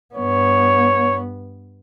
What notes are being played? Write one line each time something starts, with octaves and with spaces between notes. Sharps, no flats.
G2 B3 C#5